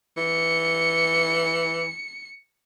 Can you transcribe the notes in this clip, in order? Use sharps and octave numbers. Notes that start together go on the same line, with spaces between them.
E3 C#7